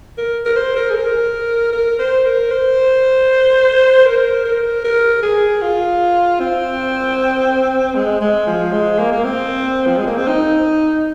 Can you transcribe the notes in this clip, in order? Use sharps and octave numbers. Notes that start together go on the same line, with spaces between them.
A#4
A#4
C5
A#4
G#4
A#4
A#4
C5
A#4
C5
A#4
A#4
A#4
G#4
F4
C4
G#3
G#3
F3
G#3
A#3
A#3
C4
F3
G#3
A#3
C4
D#4